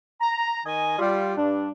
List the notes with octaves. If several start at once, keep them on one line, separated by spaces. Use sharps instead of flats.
A#5
D#3 D#5 G#5
G3 F4
G2 D4